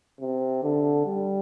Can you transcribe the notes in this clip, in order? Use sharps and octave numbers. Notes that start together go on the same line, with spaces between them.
C3
D3
G3